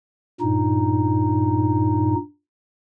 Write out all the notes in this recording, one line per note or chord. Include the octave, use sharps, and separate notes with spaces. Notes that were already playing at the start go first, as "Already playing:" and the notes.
G2 A#2 D#4